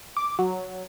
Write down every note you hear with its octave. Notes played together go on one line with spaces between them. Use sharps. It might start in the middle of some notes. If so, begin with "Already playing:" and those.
D6
F#3